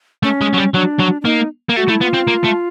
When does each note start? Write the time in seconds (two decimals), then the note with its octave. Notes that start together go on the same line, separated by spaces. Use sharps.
0.23 A3 C#4
0.41 G#3
0.53 F#3
0.57 G3
0.74 F#3 D4
0.99 F#3
1.21 D4
1.25 A#3 D#4
1.70 A#3
1.77 A3 F#4
1.89 A3 E4
2.01 B3 F4
2.14 C4
2.28 A#3
2.45 A3